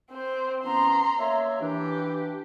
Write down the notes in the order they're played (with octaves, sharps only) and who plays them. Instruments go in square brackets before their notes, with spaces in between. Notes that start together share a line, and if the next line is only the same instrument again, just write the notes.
[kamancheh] C4 C5
[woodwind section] E3 B3 C#4 [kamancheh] A#5 C6
[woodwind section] A#3 C#5 E5
[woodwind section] E3 D4 [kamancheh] G4